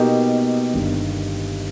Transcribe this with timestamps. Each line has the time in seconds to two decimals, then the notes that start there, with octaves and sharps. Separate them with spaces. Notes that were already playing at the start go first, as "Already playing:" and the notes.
Already playing: B2 A#3 D#4 G4
0.73 G1 G2 D#3